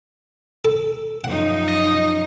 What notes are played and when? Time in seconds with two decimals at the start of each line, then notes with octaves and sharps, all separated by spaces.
0.65 A4
1.24 F#2 F3 D#4 F#5
1.69 D#5